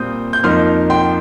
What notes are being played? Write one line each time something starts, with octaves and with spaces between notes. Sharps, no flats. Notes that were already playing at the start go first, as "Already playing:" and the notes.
Already playing: A#2 G3 C4 D#6 G6
G6
F2 F3 A#3 D#4 C6 F6
G5 C6